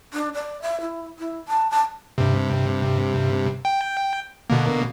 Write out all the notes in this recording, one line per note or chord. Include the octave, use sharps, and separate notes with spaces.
D4
D5
E5
E4
E4
A5
A5
G2 C3
G5
B2 D3 A#3